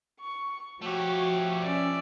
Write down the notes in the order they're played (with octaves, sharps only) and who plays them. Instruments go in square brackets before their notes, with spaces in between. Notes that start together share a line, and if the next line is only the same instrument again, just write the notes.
[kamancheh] C#6
[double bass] F3 [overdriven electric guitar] A3 G4 [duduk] F#4 [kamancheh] C#5
[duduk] C#4 [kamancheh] D5 E5